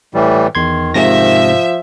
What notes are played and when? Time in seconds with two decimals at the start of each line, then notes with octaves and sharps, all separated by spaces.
0.14 A2 E3 G3
0.55 E2 D#3 C6 G#6
0.94 G#2 C3 F3 E5 A#6